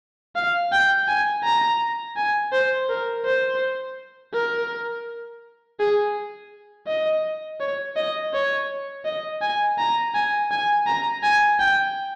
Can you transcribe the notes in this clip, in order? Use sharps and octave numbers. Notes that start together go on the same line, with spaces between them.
F5
G5
G#5
A#5
G#5
C5
A#4
C5
A#4
G#4
D#5
C#5
D#5
C#5
D#5
G#5
A#5
G#5
G#5
A#5
G#5
G5